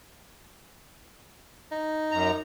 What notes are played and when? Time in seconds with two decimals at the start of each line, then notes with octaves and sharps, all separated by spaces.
1.71 D#4
2.11 F#2 A#5